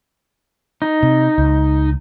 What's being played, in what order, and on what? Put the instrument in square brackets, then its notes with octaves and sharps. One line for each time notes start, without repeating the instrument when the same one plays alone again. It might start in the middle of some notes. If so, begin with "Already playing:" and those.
[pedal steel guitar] D#4
[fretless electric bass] C3
C#2